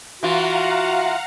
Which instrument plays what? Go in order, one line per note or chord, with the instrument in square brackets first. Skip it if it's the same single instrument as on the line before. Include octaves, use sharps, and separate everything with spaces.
[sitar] E3 F4 [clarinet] F#4 [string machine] F5 F#5 A#5